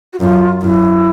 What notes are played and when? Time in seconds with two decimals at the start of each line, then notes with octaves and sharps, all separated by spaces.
0.13 F#4
0.20 F#2 F4
0.62 F#2 E4